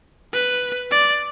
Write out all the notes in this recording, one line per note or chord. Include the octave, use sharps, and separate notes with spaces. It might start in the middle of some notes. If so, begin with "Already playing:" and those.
B4
D5